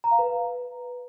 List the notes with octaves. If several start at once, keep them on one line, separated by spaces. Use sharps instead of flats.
A#5
F5
B4